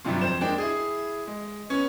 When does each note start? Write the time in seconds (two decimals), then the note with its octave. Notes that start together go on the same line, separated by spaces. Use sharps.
0.05 G2 C3 F#3 G3 D4 F4
0.21 F2 C5 E7
0.41 G#3 A#3 D4 G5
0.58 E4 G#4
1.27 G#3
1.69 B3 C#4